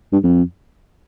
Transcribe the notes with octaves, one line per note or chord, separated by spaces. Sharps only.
G2
F2